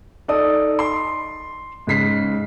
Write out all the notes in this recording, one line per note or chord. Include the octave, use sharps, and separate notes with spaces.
D#4 A4 D5 D#6
C6
G#2 C#3 B6 C7